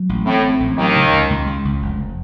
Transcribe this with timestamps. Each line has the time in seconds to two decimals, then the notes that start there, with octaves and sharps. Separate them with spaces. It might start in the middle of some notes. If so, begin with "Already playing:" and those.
Already playing: F#3
0.09 A1
0.26 A2 C4
0.43 C4
0.60 A1
0.78 D#2 D#3 F#3
0.96 C#3
1.13 C#2
1.30 C#2
1.47 C#3
1.65 C#2
1.82 F1